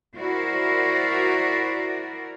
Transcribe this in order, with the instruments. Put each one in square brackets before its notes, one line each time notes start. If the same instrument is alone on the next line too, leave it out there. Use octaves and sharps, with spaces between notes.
[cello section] E4 F#4 A#4 C5 D5